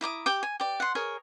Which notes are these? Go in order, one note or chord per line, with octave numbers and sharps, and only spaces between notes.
E4 A#5 D6 D#6
G4 G5 D6
G#5
G4 D5
F#5 C6
G#4 A#4 C#5